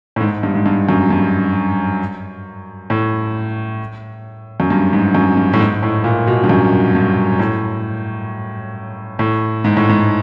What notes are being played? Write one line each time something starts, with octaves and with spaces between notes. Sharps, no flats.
A2
G#2
G2
G#2
G2
F#2
G2
A2
F#2
G2
G#2
F#2
G2
A2
G#2
A2
A#2
B2
G2
F#2
G2
A2
A2
G#2
A2
G#2